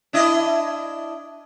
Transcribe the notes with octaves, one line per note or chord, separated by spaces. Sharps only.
D4 E4 D#5